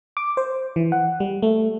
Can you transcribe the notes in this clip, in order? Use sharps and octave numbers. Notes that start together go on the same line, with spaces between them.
D6
C5
E3
F#5
G3
A3